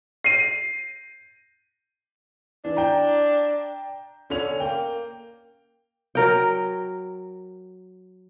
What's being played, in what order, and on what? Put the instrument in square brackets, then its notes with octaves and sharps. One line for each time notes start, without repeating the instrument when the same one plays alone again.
[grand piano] C7 D#7
[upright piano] E3 [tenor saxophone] D4
[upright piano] G5 A#5
[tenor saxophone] D3 [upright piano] C#4 F7
[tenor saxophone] A#3 [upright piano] G5
[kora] F#3 A#4 G5